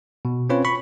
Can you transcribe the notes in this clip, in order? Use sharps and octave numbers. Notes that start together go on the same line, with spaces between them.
B2
C4 C#4 F4 B4 C#5
B5 C#6